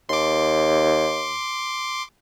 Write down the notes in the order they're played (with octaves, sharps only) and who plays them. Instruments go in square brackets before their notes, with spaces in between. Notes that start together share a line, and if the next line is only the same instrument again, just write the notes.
[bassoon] D#2 [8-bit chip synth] C6 D6